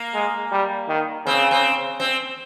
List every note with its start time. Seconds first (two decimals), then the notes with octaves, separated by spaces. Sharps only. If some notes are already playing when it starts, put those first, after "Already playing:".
Already playing: A#3
0.14 G#3
0.52 G3
0.88 D#3
1.26 C#3 C4
1.51 C4
2.00 C4